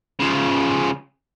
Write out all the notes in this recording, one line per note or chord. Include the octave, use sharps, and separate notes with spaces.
C#3 F3